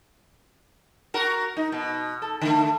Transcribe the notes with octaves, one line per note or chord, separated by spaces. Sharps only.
F#4 A#4
D#4
B2
A4
D3 A3